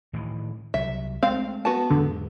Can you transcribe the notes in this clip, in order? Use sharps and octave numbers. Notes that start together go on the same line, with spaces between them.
A2 D#3 E3
C2 F#3 E5
G#3 A3 C4 F5
B3 F#4 A5
E2 G#2 D3